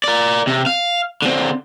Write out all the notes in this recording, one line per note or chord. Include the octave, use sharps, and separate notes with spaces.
A#4 D5
C3
F5
D3 C4